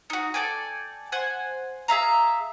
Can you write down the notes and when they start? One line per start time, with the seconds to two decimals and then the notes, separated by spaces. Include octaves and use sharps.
0.10 D#4 F#4
0.34 A4 D5 G5 G#5
1.12 C5 F#5 G#5
1.88 G#4 E5 F5 A#5